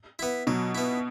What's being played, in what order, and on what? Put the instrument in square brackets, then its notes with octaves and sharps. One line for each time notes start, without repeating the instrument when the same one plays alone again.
[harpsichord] B3 E4
[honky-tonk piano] B2 [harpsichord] F#3
[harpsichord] B3 E4